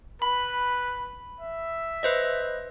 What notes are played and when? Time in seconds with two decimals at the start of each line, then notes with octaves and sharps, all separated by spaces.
0.22 B4 B5
1.41 E5
2.03 B4 C5 D#5